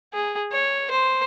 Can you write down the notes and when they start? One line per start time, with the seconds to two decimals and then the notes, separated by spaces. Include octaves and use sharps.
0.14 G#4
0.52 C#5
0.91 C5